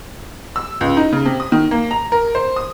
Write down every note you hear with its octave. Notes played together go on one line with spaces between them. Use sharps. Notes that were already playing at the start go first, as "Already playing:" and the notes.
E6
C#2
D#4
C#3
C3
D#6
D#3
A#3
A#5
A#4
C5
D#6